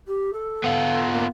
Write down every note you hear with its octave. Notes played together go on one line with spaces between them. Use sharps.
G4
A4
B3 F4
A#3